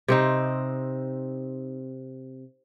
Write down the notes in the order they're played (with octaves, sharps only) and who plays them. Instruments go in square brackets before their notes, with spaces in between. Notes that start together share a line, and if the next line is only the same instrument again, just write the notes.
[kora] C3 C4 D#4